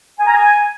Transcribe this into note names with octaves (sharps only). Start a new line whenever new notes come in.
G#5
A#5
G#5